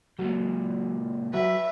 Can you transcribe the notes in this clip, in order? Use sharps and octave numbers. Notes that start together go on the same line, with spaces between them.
C#2 A#2 F#3
F#3 B4 E5